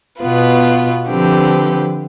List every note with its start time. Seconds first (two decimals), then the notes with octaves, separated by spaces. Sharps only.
0.20 B2 B3 F4 B4
1.07 D3 F3 C4 G4 B4